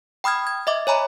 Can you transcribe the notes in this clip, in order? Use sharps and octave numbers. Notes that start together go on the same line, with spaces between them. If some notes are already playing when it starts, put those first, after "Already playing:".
G5 B5 D#6 F6 G#6
G#6
D#5 E5 D6
C#5 G#5 A#5 B5